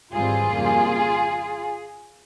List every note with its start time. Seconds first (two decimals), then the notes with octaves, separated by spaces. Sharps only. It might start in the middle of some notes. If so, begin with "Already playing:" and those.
0.13 G#1 G#2 E3 G3 C4 F4 G#4
0.52 F2 C#3 G3 A#3